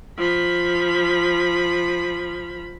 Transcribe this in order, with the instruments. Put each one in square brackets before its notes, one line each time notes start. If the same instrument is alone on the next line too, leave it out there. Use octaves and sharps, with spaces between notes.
[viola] F3 B5